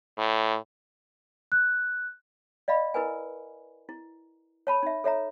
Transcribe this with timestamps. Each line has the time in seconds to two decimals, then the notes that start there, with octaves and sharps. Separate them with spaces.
0.18 A2
1.52 F#6
2.68 D5 D#5 F5 B5
2.94 E4 A#4 B4 G#5
3.89 E4
4.67 C#5 A5 B5
4.83 D#4 E5
5.04 A4 C#5 E5 A#5